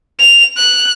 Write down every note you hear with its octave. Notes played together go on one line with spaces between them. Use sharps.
F7
F#6